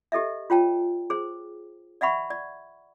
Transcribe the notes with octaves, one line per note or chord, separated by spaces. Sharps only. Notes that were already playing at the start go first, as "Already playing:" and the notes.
G4 A4 D#5 E5
F4 C#5 G5 A5
G#4 C5
D5 E5 F#5 B5 C#6
D5